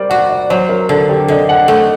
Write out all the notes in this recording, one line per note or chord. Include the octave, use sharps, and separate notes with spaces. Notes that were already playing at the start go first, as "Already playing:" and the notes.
Already playing: G3 A#4 C5 D5
F#4 F#5
D5
F#3 C5
A#4
D3 A4
G4
D3 D#5
F#5
A3 D#5